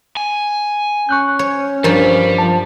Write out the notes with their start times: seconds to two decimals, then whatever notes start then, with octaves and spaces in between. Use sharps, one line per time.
0.17 G#5
1.09 C#4 C#6 F#6 G6
1.39 C#5
1.84 G2 F3 G3 A#4
2.38 F3 A5